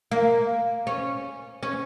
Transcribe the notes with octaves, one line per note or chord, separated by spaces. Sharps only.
A#3
C#4
C#4